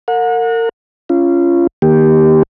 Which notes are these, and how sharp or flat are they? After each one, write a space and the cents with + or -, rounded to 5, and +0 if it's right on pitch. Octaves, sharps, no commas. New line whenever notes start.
A#4 -35 F#5 -35
C#4 +0 F4 -25
D#3 +0 A#3 +20 G4 +0